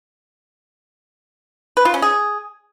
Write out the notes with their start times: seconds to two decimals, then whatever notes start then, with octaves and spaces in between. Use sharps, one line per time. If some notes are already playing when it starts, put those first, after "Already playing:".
1.77 B4
1.85 F4
1.94 C#4
2.02 G#4